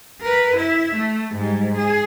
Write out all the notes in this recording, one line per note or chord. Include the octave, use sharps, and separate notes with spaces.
A#4 B4
E4 E5
A3
G#2 G3
G#4